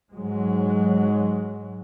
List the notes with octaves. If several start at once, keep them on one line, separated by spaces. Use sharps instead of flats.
G#2 F#3 G#3